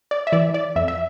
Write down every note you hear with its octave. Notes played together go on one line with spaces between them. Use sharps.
D5
E5
E3 D5
D5
F2 E5
E5